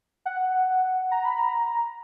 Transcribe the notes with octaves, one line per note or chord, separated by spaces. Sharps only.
F#5
A#5
B5
A#5